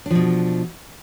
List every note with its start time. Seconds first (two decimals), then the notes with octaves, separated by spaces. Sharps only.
0.06 D4
0.11 F3
0.15 B2